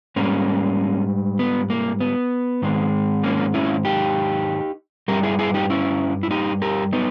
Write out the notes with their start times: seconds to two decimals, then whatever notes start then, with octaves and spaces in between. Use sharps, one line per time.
0.16 G#2 G3 A#3 C#4
1.39 B3
1.70 A#3
2.00 B3
2.62 G#2 D#3 G#3
3.23 A#3 C#4
3.54 C#4 E4
3.85 D#4 G4
5.08 G2 G3 G4 A#4
5.23 E4 G#4
5.39 E4 G#4
5.54 D#4 G4
5.70 C#4 E4
6.23 E4
6.31 D#4 G4
6.62 G4 A#4
6.93 B3 D#4